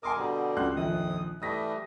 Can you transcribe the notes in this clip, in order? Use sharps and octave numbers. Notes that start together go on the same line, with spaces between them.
A#4 G#5 C6 D6 D#6
B2 D3 G3 A#5
C#2 C6 F#6
A#1 F2 D#3 D#6
E3 G3 A3 D#6 A#6 B6